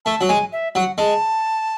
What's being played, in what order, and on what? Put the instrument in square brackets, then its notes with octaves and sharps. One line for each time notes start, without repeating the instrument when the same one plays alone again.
[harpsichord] A3 [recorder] A5
[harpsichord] F#3
[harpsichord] G#3 [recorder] G#5
[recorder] E5
[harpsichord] F#3 [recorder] F#5
[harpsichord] G#3 [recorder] A5